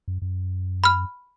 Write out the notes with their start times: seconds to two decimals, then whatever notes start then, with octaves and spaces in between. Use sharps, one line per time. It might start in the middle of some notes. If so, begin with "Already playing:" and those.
0.08 F#2
0.22 F#2
0.84 B5 F6